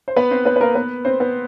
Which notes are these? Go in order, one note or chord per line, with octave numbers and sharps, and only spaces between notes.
C5
B3 B4
C4 C5
B3 B4
B4
A#3 A#4
B3 B4
C4 C5
B3 B4